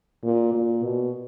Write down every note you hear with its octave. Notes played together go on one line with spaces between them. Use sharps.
A#2
A#2
B2